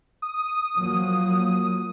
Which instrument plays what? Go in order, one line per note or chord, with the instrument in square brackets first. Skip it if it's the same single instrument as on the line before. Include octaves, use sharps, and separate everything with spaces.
[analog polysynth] D#6
[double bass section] F3 F#3 A#3